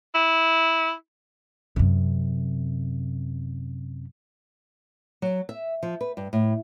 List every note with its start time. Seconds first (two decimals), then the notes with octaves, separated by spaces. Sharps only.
0.14 E4
1.76 F#2 C3
5.22 F#3
5.49 E5
5.83 F3
6.01 B4
6.17 G2
6.33 A2